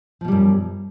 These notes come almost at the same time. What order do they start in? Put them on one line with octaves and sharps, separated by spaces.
F3 B2 G3 F#2